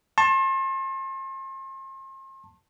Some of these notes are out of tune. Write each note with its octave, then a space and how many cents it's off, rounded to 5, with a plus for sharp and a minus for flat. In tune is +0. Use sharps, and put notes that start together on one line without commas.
A5 +10 C6 +40